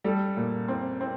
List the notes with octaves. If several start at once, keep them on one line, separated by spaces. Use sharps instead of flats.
G3 A4
A#2
C4
C4